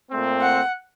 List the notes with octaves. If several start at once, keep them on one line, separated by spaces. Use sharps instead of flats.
A#2 A3 C4
F#5